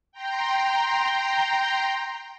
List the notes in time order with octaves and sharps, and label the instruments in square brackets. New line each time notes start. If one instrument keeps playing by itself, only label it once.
[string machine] G5 A#5 C6